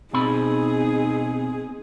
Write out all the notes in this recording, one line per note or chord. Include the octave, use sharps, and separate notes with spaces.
B2 C4 D#4 G#4 B5